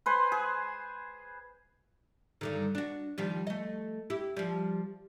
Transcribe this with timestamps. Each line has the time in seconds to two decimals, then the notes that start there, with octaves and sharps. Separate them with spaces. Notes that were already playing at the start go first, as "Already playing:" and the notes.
0.06 B4 C5 G#5
0.32 G#4
2.41 G2 D3 D#3
2.75 D4 F#4
3.18 D#3 F3 G3
3.47 A3 D#5
4.10 E4 G4
4.37 F3 G3